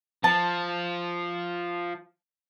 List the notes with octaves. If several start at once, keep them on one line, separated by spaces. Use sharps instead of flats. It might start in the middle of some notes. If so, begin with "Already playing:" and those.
F3 A5